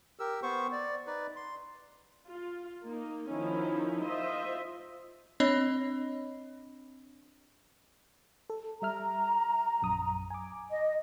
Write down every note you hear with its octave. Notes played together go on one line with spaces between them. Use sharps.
G4 A#4 E6
B3 C5 C#6
D5
D#4 B4 D5
C6
F4
A#3 D#4
D#3 F3 C#4 D#4 E4
F4 C5 D#5 E5
C4 D4 C#5 D#5 B5
A4
G3 E5 A#5 F6
A#1 F#2 D#6
G#5 D6
D#5